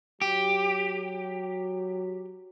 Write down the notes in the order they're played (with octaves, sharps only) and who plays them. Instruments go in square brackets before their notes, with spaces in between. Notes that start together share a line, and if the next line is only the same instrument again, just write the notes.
[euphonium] F#3 [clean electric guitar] G4